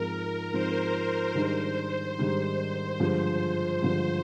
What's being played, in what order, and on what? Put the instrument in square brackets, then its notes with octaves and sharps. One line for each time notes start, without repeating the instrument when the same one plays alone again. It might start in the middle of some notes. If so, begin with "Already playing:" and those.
Already playing: [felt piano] G#2 F3 C4 D#4 [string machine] A#4
[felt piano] G#2 F3 C4 D#4 [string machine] C5
[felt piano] G#2 D#3 G3 D4 [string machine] C5
[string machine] C5
[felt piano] G#2 D#3 G3 D4
G2 D3 F3 G#3
[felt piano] G2 D3 F3 G#3 [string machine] C5